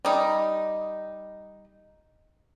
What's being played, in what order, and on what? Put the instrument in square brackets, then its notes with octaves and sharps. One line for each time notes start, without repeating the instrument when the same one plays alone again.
[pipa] G3 D#4